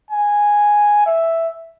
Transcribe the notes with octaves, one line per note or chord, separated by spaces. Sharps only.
G#5
E5